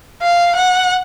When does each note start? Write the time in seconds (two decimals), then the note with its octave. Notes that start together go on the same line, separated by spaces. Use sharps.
0.23 F5
0.56 F#5